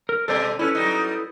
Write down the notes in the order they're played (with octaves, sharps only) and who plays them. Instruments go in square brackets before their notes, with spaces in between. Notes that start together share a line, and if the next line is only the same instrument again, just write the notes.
[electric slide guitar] A#4
[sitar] B2 G3 [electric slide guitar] A4 C5 D5
[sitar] C#4 [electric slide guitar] E4 A4 B4
[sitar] F#3 G3 D#4